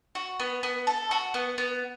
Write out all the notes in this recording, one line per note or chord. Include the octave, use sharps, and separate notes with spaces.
F#4
B3
B3
A4
F#4
B3
B3